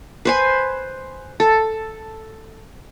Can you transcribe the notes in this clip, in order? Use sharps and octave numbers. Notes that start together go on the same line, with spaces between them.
B4 C5 G#5
A4